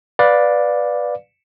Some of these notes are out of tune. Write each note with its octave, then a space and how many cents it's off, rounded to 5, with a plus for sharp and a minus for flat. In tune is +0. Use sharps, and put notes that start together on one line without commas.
B4 +0 D5 +0 F5 +20